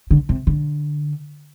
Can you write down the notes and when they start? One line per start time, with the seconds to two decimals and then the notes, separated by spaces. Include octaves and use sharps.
0.11 D3
0.29 C3
0.47 D3